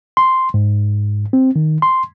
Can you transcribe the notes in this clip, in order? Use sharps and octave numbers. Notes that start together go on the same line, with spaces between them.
C6
G#2
C4
D#3
C6